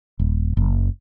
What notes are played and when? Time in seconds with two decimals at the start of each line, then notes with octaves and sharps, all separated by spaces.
0.19 D#1
0.57 F#1